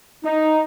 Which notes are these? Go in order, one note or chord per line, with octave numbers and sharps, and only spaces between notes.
D#4